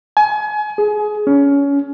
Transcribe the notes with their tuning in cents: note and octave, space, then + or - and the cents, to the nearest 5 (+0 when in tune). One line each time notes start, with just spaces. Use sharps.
G#5 +35
G#4 +15
C#4 +25